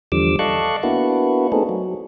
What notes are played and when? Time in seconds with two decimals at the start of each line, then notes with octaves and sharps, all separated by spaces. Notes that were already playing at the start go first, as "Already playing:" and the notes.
0.12 E2 D3 F3 G3 D6 E6
0.39 A4 D5 D#5 F5 C#6 F#6
0.83 A#3 B3 D4 E4 F#4
1.52 A3 B3 C4 D#4 G#4 A4
1.69 F#3